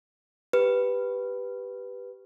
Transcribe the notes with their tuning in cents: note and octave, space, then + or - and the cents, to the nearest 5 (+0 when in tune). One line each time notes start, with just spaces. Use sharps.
G4 +0 B4 +0